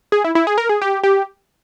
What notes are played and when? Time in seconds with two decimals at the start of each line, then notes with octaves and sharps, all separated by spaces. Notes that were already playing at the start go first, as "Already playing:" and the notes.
0.12 G#4
0.24 E4
0.35 E4
0.47 G#4
0.58 A#4
0.69 G#4
0.82 G4
1.03 G4